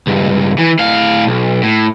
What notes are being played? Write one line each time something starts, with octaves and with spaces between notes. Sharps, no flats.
C#2 G2
E3
A2 F5
B1
A2